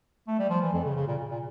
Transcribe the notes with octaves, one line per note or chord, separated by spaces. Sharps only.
A3
G3
F3
E3
F2
C#3
C#3
A#2
A#2